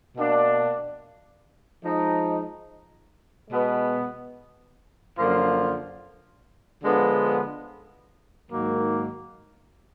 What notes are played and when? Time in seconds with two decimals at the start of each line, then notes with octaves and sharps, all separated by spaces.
0.17 B2 A#3 D4
1.85 F3 G#3 D#4
3.51 B2 G#3 B3
5.17 F#2 D3 F3 A#3 F4
6.84 D3 F3 G#3 B3
8.50 G#2 D#3 F#3 A#3